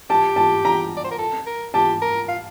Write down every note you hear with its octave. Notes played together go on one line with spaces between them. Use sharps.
G4 A5
A5
A#5
D5
C5
A#4
A4
A#4
G4 A5
A#4
F5